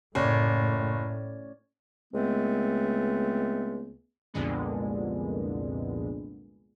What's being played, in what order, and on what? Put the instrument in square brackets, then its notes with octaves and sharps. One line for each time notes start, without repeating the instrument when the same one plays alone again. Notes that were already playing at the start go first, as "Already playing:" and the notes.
[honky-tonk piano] F#1 [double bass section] A2 [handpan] C#4 C#5 D5
[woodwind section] C#2 G#3 A3 B3 C4
[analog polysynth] C2 F2 A#2 D3 G#3 B3